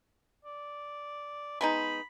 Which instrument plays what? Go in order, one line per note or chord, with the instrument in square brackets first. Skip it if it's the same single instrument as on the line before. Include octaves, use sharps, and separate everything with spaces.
[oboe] D5
[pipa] G#3 B3 D#4 [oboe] B5